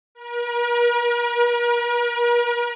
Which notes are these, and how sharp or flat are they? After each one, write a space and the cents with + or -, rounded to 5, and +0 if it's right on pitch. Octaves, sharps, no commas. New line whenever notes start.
A#4 +45